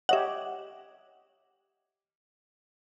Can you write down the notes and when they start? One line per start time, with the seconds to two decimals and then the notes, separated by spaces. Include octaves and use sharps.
0.09 G4 C#5 D#5 E5 F#5